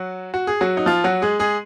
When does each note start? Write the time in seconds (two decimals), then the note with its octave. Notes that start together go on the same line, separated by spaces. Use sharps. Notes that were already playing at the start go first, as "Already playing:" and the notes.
Already playing: F#3 F#4
0.34 F#4
0.47 G#4
0.61 F#3 F#4
0.77 D#4
0.86 F3 F4
1.04 F#3 F#4
1.22 G#3 G#4
1.39 G#3 G#4